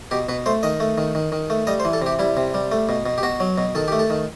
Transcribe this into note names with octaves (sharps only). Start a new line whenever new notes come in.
B2 G4
B2 B4
A3 C5
D#3 D#5
A3
D#3
D#3
D#3
A3
G3 D#5
C5
E3
A4
C3 G4
G3 E4
C3
G3
A3
B2
B2
G4
B2 F#4
F#3
B2
D#3 A4
A3 G4
A4
D#3